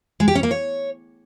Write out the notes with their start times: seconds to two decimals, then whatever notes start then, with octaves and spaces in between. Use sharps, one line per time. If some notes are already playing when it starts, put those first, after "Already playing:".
0.20 G#3
0.28 G4
0.35 C#4
0.43 A#3
0.51 C#5